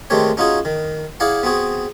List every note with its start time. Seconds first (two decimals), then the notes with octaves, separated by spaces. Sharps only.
0.10 D#3 G#3 A3 C4 G4 C#5
0.37 C#4 D#4 F4 F#4 G#4
0.65 D#3
1.20 E4 G#4 D5 F5 F#5
1.43 B3 C4 F#4 G#4